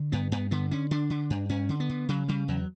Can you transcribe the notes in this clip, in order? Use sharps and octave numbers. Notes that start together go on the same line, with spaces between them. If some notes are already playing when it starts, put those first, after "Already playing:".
Already playing: D3
G2 B3
G2 B3
D3 B3
D3 C#4
D3 D4
D3
G2
G2 C#4
D3
B3
D3
C#3 F#3
C#3 G3
E2 F#3